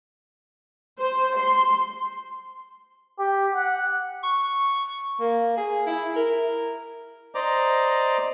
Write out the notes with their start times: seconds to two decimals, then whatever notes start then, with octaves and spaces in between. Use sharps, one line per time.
0.99 C5
1.37 C6
3.19 G4
3.54 F#5
4.23 C#6
5.20 A#3
5.57 G#4
5.86 E4
6.16 A#4
7.35 C5 D5 D#5 A#5 D6